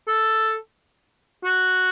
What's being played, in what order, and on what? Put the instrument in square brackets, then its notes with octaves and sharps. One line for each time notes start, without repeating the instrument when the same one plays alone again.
[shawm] A4
F#4